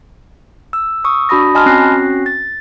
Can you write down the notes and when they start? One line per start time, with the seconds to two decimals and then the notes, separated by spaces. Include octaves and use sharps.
0.73 E6
1.04 C#6 D#6 E6
1.29 D4 F#4 B5 D#6 A#6
1.55 D#5 G#5 A5 B5 C6 F6
1.66 C4 C#4 F#4 F#6 A#6 C7
2.26 A6